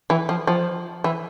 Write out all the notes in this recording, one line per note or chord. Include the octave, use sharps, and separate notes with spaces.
E3
F3
F3
E3